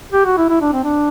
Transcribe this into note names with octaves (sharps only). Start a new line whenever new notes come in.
G4
F#4
E4
E4
D4
C4
D4